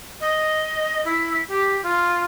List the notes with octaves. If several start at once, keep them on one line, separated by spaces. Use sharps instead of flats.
D#5
E4
G4
F4